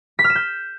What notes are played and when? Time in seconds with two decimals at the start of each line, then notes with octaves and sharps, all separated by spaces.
0.19 B6
0.24 F6
0.30 E7
0.35 G6